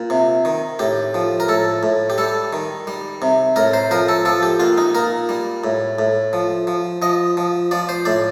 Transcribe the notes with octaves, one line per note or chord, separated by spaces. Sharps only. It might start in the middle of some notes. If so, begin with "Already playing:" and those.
Already playing: A#2
C3
D#3
A2 G4
F3
A#4
A2 A4
A2
G4
G3 A4
D#3
G3
C3
A2 A#4
C5
F3 A#4
A4
F3 A4
G4
A#2 F4
D#4
A#2 A#4
G3
A2
A2
F3
F3
F3 D#5
F3
F3 D5
C5
A2 D5